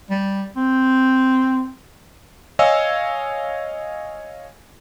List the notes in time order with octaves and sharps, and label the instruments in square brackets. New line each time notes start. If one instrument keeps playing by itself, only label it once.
[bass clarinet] G3
C4
[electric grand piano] C#5 D#5 F5 G#5 E6